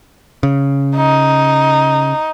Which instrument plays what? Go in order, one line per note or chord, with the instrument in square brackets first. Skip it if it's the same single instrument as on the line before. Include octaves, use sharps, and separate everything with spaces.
[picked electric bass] C#3
[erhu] D#4